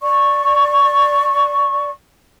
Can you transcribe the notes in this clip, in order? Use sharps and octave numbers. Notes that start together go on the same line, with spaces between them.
D5 C#6